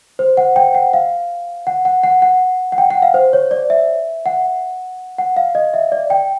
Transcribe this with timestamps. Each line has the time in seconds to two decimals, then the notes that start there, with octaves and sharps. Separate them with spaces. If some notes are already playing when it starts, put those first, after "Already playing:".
0.19 C5
0.37 F#5
0.56 G5
0.75 F#5
0.93 F5
1.67 F#5
1.85 F#5
2.04 F#5
2.22 F#5
2.72 F#5
2.78 G5
2.90 F#5
3.02 F5
3.14 C5
3.33 C#5
3.51 D5
3.70 E5
4.26 F#5
5.18 F#5
5.37 F5
5.55 D#5
5.74 E5
5.92 D5
6.10 G5